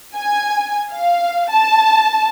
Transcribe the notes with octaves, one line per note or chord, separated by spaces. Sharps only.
G#5
F5
A5